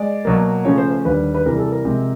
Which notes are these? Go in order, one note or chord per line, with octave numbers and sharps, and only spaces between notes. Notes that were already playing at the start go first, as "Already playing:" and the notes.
Already playing: G#3 D5
B2 F#3 A#3
C#3 F3 A3 C#4 C#5
C5
C5
D#2 D3 G3 B4
B4
C3 E3 G3 A#4
G#4
A4
A#4
C3 F3 G#3 C4